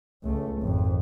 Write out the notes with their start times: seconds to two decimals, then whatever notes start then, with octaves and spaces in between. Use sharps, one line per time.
0.23 C#2 A3
0.62 G#1 F2